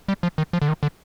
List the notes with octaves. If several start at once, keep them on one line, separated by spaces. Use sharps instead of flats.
G3
F3
D#3
F3
D3
D#3
D3